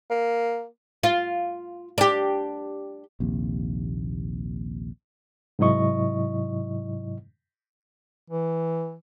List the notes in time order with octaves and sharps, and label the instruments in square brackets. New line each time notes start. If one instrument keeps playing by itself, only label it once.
[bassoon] A#3
[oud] F4
D4 G4
[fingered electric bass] A#1 D#2 C3
[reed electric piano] G#2 C3 F#3 E4 D#5 C#6
[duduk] E3